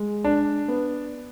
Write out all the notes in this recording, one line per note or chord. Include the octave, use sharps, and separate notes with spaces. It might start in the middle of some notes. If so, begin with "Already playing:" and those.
Already playing: G#3
D4
B3